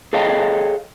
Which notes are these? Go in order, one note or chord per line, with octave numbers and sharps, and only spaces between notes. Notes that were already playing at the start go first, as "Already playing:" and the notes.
G#4 A4 C#5 D#5 F5 G5